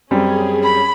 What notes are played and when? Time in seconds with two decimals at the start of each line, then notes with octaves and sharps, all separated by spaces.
0.11 F#2 G3 C4 C#4 G#4
0.64 B5